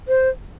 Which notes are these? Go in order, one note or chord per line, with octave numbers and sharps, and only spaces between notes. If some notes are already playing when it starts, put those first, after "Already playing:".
C5